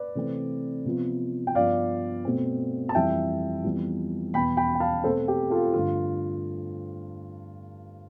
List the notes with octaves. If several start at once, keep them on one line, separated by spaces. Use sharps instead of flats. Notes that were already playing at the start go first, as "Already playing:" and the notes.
Already playing: B4 D5
C3 E3 A3 C4
C3 F3 B3
G5
G2 F3 B3 D5 F5
B2 A3 C4
A5
F2 E3 G3 E5 G5
F2 E3 G3 B3
E2 B2 B3 G5 B5
G5 B5
G5
F5 A5
B2 A3 C4 A4 C5
G4
F4 A4
G2 D3 A3 F4